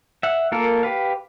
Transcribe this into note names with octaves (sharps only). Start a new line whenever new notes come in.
E5 F#5
A#3 F4 A4 A#4
G4 B4 F5